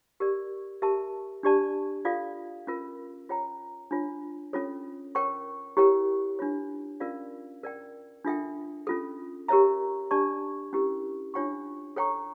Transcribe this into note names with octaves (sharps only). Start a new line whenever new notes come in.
G4 A#4 D5
G4 A#4 E5 A5
D4 G4 D5 A5
F4 A4 D5 F5
C#4 F4 A#4
F4 C#5 G5 A#5
D4 F4 C#5
C#4 F4 A4 C#5
A#4 C#5 G5 C#6
E4 G4 A#4 C#5 G5
D4 F4 C#5
C#4 F4 A#4 D5 F5
A#4 D5 G5
D4 F4 A4 E5 G5
C#4 F4 A4
G4 A#4 C#5 E5 A#5
D4 G4 D5 A5 C#6
C#4 E4 G4 A#4
D4 F4 C#5 G5 C#6
A4 C#5 G5 A#5 C#6